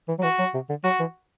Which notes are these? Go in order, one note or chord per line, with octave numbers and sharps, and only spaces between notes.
E3
F#3
E3 F#4
F#3
C3
D3
F#3 F#4
E3